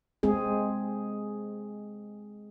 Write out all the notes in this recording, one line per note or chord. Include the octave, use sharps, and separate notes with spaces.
G#3 C4 G#4